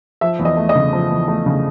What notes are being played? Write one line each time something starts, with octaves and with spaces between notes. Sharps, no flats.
F3 E5
E2
D#5
A3
D#5
C#3
F3
E2
A3
C#3